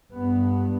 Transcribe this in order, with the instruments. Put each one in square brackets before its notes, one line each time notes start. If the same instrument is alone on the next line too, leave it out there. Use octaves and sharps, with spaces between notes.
[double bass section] G2 B3